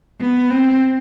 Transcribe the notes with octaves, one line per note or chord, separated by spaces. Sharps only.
B3
C4